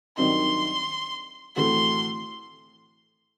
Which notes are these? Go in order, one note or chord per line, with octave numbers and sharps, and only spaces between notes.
G2 D#3 F#3 C4 D#4 C6
A2 E3 A3 C4 F#4 C6